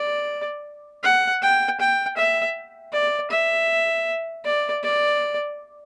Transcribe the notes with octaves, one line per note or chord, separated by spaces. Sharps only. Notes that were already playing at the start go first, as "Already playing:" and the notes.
Already playing: D5
F#5
G5
G5
E5
D5
E5
D5
D5